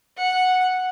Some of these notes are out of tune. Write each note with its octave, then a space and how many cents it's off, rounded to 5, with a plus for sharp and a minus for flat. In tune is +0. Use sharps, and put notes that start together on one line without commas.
F#5 -5